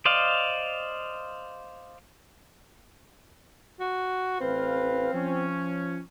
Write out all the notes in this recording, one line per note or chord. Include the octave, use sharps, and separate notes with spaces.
C5 D5 D#5 F5
F#4
A1 C4 B4 F5
F3 C#4